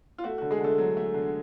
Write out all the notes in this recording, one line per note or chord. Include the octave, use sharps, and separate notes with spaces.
F4
A3 F#4
D3 F#4
G#3 G#4
D3 A3 A4
F#3
A3
D3